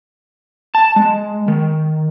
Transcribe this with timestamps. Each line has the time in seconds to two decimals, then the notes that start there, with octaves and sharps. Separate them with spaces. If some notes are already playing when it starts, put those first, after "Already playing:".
0.75 A5
0.96 G#3
1.48 D#3